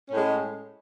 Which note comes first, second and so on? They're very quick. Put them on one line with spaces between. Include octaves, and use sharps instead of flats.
C#4 A2 G#3